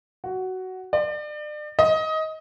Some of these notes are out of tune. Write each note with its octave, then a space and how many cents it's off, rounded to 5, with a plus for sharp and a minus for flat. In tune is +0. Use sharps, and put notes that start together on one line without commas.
F#4 +10
D5 +35
D#5 +20